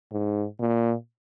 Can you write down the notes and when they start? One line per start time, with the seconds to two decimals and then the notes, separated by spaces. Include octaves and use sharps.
0.12 G#2
0.60 A#2